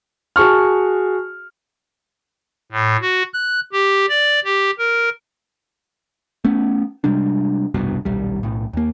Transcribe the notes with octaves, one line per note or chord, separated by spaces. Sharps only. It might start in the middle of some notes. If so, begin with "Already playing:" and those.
F#4 G#4 A5 C#6 F6
A2
F#4
F#6
G4
D5
G4
A#4
A3 B3 C#4
C3 G3 G#3 D4
F1 C2 G2 B2
D#1 B1 G3
B1 A2
D#2 A#3